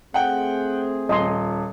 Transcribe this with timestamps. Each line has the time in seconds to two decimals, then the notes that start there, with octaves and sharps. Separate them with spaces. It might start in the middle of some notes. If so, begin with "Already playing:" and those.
0.14 A3 C4 G#4 F#5 G5
1.09 D#1 D#5 G#5 C6